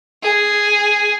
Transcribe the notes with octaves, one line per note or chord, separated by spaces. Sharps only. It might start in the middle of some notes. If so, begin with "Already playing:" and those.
G#4